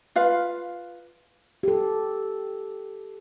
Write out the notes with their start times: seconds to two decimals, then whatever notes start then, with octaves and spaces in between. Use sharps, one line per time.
0.16 F4 B4 F5
1.63 G4 A4